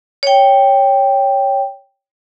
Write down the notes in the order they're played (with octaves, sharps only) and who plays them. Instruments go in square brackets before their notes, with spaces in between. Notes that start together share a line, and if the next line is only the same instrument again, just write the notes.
[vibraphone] C#5 G5